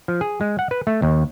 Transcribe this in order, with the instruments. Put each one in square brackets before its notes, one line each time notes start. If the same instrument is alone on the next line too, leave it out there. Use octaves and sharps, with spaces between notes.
[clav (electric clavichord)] F3
G#4
G#3
F#5
B4
A3
D#2